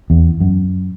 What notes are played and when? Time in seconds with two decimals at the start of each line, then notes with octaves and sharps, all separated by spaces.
0.10 E2
0.40 F#2